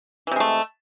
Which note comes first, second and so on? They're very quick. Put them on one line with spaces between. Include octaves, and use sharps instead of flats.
E3 C3 G#3 A3